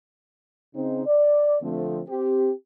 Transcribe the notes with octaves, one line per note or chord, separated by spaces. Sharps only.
C#3 C4 D#4
D5
D3 F3 A3 C4
C4 G4